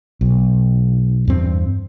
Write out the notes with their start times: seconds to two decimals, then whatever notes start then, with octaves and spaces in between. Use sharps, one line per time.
0.21 B1
1.27 E2 G2 C4